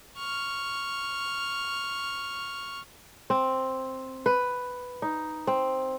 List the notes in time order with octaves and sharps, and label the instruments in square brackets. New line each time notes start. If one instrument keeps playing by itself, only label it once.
[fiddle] C#6 F6
[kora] C4
B4
D#4
C4